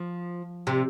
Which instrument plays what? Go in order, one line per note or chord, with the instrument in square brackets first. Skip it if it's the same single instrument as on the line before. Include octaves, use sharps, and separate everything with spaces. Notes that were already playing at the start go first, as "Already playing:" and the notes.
Already playing: [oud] F3
C3